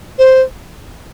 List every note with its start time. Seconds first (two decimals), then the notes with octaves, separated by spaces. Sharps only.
0.18 C5